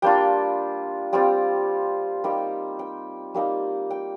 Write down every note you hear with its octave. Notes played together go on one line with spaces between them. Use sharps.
G3 A#3 D4 F4 G5
G3 C4 F4 G5
G3 A#3 D#4 G5
G5
G3 A#3 D#4
G5